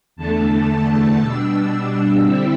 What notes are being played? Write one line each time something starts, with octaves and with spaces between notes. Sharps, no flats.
E2 D3 A3 A5
B2 G3 D4 E6
D3 G3 C4 E4 E6